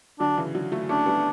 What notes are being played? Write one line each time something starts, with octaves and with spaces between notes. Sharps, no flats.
D3 F#3 D4
C#3 E3
D3 F#3
F#3 A3
A3 C#4 D4
G3 B3